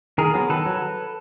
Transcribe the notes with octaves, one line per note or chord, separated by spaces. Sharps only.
D#3 G#4 A#4
F#3 B3
D#3 A4 B4
F#3